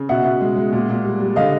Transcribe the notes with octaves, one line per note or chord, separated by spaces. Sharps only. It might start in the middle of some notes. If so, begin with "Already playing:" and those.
Already playing: C#3
B2 E5 F#5
B2
G#3
G#3
A#2
A#2
G3
G3
D3 D#5 F5